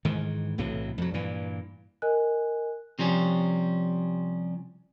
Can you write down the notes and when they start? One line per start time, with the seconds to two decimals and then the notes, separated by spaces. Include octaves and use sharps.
0.05 G#2 D#3 E3
0.58 B1 A2 C3 E3
0.98 F2 F#3
1.14 G2 A#2 E3
2.02 A#4 D#5 G#5 F#6
2.99 C3 F3 G3 C#4